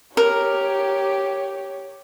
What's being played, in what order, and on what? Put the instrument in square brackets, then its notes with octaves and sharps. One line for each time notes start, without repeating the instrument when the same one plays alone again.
[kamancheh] G4 C#5 [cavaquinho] A#4